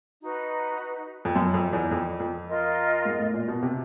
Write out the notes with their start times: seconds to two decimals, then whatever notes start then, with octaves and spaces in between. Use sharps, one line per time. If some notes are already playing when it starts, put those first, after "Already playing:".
0.21 D#4 F#4 B4
1.25 F2
1.36 F#2
1.54 F2
1.73 E2
1.91 F2
2.20 F2
2.48 F4 A#4 D#5
3.05 G#2
3.19 A2
3.34 A#2
3.48 B2
3.62 C3